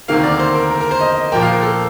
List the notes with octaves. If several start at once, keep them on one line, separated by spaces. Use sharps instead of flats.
D2 C3 D#3 A#3 F5
D5
C5
A#4
A#4
A#4
C5
D#5
D#5
A#2 F3 A#3 G5
F5
A#4
A4